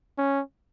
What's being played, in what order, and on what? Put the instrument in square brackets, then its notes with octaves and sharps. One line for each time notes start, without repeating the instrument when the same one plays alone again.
[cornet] C#4